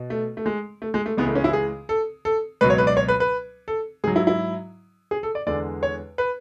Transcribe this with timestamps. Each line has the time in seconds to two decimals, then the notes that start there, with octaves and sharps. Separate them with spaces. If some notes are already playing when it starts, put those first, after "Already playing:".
Already playing: B2
0.10 A3
0.37 A3
0.46 G#3
0.82 A3
0.94 G#3
1.06 A3
1.17 C#2 C#3 E3 G#3 B3
1.26 A3
1.35 C#4
1.44 E4
1.53 G#4
1.89 A4
2.25 A4
2.61 C#2 B2 F#3 B4
2.70 C#5
2.78 B4
2.87 D5
2.97 C#5
3.08 B4
3.20 B4
3.68 A4
4.04 G#2 G#4
4.08 F#3
4.16 E4
4.27 E4
5.11 G#4
5.23 A4
5.35 D5
5.47 E2 D3 G#3 D5
5.83 C#5
6.18 B4